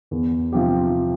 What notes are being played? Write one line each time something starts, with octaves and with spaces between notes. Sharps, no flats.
E2
C3 F3 C4 G4